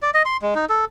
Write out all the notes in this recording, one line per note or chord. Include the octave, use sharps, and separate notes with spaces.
D5
D#5
C6
G#3
D#4
A4